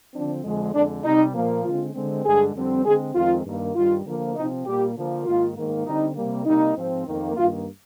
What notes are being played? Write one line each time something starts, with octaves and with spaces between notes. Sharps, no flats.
D3 F3 C4 D4
F2 D3 G#3
F2 D3 G#3 D4
C3 G3 C4 D#4
A#2 F3 A#3
D3 G#3 C4 F4
D3 G#3 C4
G2 D3 G#3 G#4
F2 D3 G3 C4
D3 G#3 C4 G#4
F2 D#3 G#3 C4 F4
G2 D#3 A#3
G2 D#3 G3 F4
D3 F3 A#3
C3 F3 C4 D#4
A#2 G3 A#3 G4
D3 F3 A#3
G#2 D#3 A#3 F4
G#2 D#3 A#3
D3 G3 C4 D#4
C3 G3 A#3
C3 G3 A#3 D#4
G#2 F3 C4
F2 D#3 A#3
G2 D#3 A#3 F4